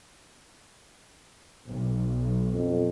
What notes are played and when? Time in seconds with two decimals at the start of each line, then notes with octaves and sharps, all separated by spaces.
1.66 B1
2.54 F2